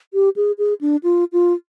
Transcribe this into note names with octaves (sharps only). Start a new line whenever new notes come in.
G4
G#4
G#4
D4
F4
F4